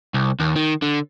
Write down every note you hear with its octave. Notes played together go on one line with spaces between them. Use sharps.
C2
D#2
D#3
D3